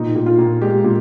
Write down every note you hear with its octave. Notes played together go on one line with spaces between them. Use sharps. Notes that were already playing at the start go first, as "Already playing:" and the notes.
Already playing: A#2 D#4
A#2
F4
A#2
G#3 G4
A#2